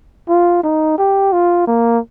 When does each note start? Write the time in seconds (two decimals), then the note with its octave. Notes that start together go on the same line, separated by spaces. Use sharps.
0.29 F4
0.64 D#4
0.98 G4
1.32 F4
1.67 A#3